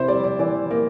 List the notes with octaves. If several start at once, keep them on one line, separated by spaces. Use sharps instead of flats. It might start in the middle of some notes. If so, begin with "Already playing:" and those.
Already playing: C3 E4 C5
G3 D5
D5
E3 D5
A#3